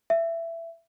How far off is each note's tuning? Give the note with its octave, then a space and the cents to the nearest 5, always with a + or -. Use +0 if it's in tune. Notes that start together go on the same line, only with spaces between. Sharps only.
E5 +15